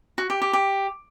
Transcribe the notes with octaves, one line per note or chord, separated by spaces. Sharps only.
F#4
G4
G4
G4